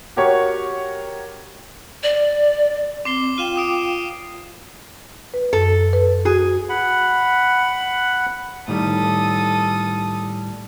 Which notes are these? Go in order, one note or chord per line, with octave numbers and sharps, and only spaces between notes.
F#4 G4 A#4 C#5 F#5 C#6
D5
C4 D6 C7 G7
F4 F5 G5 D#7 E7
D6 D#6 D7
B4
F#2 A4
B4
F#4 G#4
F#5 B5
A2 D#3 G3 A4 D#6